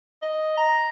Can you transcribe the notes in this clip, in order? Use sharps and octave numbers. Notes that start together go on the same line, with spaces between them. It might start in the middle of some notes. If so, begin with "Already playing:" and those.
D#5
A#5